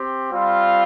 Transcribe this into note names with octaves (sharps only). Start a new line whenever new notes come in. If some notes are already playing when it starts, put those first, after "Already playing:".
Already playing: C4 G4
G3 C4 F4